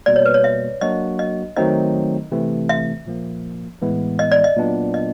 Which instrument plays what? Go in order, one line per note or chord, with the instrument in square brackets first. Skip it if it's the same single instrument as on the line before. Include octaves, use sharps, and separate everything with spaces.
[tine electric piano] B2 G3 A#3 [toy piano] D5
[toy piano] C#5
B4
C#5
E5
[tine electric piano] F#3 A#3 D4 F#4 [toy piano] D#5
[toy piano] D#5
[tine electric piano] D#3 F#3 A3 C4 D#4 [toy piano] D#5
[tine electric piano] C3 E3 A3 C4
[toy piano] E5
[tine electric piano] A#2 F3 A#3
A2 E3 G#3 B3 E4
[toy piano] D#5
D5
D#5
[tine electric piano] A#2 F#3 B3 D4
[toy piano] D#5